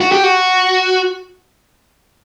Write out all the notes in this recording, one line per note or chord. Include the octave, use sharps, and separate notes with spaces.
F#4
G4
F#4